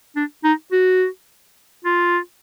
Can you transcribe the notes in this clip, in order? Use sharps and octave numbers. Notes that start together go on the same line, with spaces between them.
D4
D#4
F#4
F4